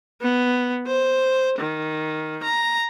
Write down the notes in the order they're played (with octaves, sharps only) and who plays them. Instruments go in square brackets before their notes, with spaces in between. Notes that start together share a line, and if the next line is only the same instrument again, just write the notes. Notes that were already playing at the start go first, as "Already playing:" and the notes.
[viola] B3
C5
D#3
A#5